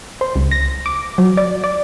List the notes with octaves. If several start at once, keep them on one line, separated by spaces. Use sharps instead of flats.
C5
C#2
A#6
D6
F#3
D5
D5